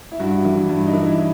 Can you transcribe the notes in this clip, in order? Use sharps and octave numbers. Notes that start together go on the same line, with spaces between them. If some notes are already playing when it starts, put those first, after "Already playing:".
E4
G2 F#4
E3
G2
D#4
E3
E4